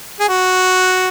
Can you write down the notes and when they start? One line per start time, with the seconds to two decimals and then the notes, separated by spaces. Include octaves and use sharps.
0.20 G#4
0.29 F#4